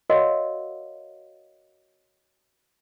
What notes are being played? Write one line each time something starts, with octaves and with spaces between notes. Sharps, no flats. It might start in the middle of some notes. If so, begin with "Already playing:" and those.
F#4 A#4 C#5 D#5 F5 F#5